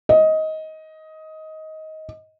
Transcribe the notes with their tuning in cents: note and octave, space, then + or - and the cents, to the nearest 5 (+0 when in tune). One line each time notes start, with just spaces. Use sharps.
D#5 +15